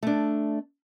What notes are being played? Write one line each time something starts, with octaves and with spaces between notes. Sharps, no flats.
A3 D4